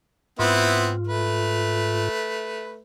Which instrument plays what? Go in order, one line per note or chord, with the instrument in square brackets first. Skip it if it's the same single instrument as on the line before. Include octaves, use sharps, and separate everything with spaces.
[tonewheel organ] G#2 F4 [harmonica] B3 C4 E4
[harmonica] A3 B4